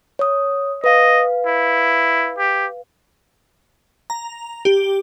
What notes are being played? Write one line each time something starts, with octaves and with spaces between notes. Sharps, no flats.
C#5 D#6
B4 D#5 F5
E4
G4
A#5
G4